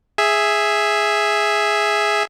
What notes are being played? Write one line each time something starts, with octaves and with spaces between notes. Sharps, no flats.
G#4 E5